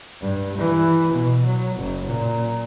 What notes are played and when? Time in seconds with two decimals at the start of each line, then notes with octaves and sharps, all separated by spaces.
0.21 G2
0.58 E3
1.12 B2
1.45 F#3
1.76 F#1
2.07 A#2